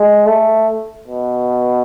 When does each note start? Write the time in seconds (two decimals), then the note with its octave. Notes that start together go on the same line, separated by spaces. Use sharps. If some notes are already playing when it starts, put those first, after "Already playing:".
Already playing: G#3
0.26 A3
1.07 B2